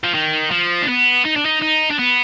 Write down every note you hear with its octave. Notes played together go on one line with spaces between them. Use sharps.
F3
D#3
F3
D4
B3
D#4
D4
D#4
D#4
D4
B3